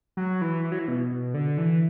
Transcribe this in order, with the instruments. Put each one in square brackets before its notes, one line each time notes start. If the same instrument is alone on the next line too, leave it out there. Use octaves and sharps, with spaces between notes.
[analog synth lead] F#3
E3
E3
F#3
E3
B2
B2
D3
E3